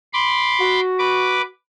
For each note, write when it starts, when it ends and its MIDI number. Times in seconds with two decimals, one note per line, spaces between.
0.13 0.80 83
0.13 0.80 84
0.13 0.80 86
0.60 1.47 66
0.99 1.42 71
0.99 1.42 86